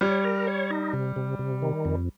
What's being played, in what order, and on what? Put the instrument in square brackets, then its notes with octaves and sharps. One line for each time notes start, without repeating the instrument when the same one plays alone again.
[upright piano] G3 [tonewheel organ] C#5
[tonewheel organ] A#4
C#5
D#4
C3
C3
C3
D#3
F2